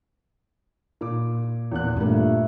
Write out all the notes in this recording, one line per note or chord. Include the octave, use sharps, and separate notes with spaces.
A#2 D6
E2 A#2 F#6
G2 A#2 A3 A#4